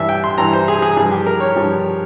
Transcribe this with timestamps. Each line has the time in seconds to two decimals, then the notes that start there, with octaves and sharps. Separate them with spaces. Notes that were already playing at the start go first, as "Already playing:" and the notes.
Already playing: G2 E3 E5
0.09 G5
0.24 C6
0.38 G2 E3 A#5
0.53 C5
0.68 G#4
0.82 G#4
0.96 G2 F3 G#4
1.11 G4
1.26 A#4
1.40 C#5
1.56 G2 F3